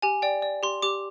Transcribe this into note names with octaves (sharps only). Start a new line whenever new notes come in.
G4 G#5
D5 G5
D5
G4 C6
G4 D6